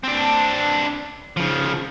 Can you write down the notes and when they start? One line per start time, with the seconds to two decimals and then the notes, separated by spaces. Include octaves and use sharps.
0.04 C4 D4
1.37 C#3 F3